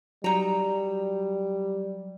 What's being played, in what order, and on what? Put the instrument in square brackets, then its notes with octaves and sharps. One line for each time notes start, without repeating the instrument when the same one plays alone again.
[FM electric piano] F#3 [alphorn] G3 [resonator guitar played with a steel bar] D#4 A#5